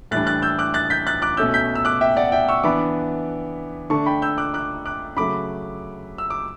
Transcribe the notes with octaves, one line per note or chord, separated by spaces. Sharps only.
A2 E3 G3 D4 F#6 A6
F#6 A6
E6 G6
D6 F#6
F#6 A6
G6 B6
F#6 A6
D6 F#6
B2 A3 C#4 E6 G6
G6 B6
E6
D6 F#6
E5 G5
D5 F#5
E5 G5
C#6 E6
E3 B3 D4 B5 D6
D3 A3 D4 A5 C#6
G5 B5
E6 G6
D6 F#6
D6 F#6
D6 F#6
C#3 F#3 A3 B5 D6
E6
D6